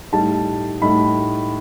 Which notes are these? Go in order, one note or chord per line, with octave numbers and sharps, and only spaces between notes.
A2 G3 D#4 A5
A2 G3 D#4 B5